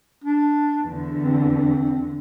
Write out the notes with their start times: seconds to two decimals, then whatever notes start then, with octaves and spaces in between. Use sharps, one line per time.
0.24 D4
0.82 E2 D3
1.23 C4